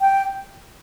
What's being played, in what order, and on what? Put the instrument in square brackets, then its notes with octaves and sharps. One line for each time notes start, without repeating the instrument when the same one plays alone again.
[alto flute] G5